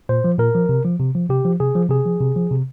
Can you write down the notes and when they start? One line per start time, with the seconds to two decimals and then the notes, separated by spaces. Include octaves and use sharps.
0.09 A#2 C5
0.24 F3
0.39 A#2 A#4
0.55 F3
0.69 C3
0.85 F3
1.00 C3
1.15 F3
1.30 C3 G4
1.45 F3
1.60 C3 G#4
1.75 F3
1.90 C3 G#4
2.06 F3
2.21 C3
2.36 F3
2.51 C3